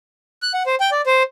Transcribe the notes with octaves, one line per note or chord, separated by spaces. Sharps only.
F#6
F#5
C5
G5
D5
C5